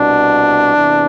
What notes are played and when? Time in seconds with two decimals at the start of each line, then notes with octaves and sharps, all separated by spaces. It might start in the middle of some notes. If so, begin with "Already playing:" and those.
Already playing: C2 B2 D4
0.77 E2 C3 E3